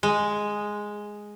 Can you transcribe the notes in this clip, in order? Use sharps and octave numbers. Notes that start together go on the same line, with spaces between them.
G#3